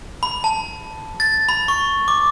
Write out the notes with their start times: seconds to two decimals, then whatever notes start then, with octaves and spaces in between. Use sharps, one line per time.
0.23 B5
0.44 A5
1.20 A6
1.49 B5
1.68 C#6
2.08 D6